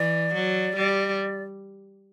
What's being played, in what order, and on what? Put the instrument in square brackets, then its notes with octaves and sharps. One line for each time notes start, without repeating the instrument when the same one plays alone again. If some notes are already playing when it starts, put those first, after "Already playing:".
Already playing: [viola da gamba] E3 [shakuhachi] D5
[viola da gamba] F#3
G3